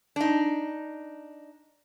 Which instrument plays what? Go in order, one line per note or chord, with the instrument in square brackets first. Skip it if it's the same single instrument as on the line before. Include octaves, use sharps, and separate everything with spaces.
[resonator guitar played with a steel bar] D4 D#4